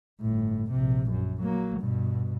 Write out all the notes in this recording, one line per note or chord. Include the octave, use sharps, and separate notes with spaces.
G1 A2
A#1 C3
F#2
F#3 A#3
G2 B2